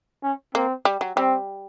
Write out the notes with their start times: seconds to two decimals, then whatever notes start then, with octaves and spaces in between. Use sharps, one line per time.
0.23 C#4
0.55 A#3 C4
0.85 G3
1.01 F#3
1.17 G3 C4